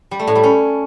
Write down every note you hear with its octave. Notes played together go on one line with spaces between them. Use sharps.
G3
A3
A2
G3
C#4